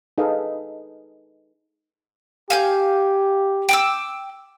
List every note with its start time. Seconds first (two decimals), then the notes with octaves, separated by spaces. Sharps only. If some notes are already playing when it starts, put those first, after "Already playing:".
0.18 D#4 G#4 A4 B4 D#5 F5
2.50 G4 F5 G#5 G6
3.69 G5 D6 E6